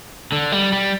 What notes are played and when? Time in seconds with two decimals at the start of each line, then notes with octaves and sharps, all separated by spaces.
0.32 D3
0.52 G3
0.72 G3